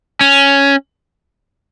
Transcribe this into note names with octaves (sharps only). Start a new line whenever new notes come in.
C#4